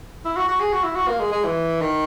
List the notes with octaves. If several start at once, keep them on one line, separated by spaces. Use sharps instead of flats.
E4
F#4
F#4
G#4
F#4
E4
F#4
A#3
G#3
G#3
E3
D#3